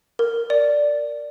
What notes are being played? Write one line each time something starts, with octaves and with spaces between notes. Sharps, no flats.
A#4
D5